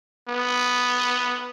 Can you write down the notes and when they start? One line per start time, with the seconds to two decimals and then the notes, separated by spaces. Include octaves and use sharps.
0.29 B3